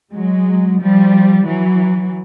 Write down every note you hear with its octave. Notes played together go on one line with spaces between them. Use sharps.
F#3 G#3
F3 G3
E3 F#3